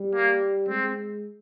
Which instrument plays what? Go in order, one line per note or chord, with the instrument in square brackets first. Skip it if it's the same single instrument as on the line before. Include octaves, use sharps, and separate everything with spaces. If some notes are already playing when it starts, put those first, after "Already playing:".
Already playing: [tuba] G3
[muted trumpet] A#3
[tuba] G#3 [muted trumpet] C4